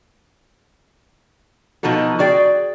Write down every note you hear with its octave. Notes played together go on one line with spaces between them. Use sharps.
B2 F3 D#4 F#4 A4
F#4 G#4 D5 G5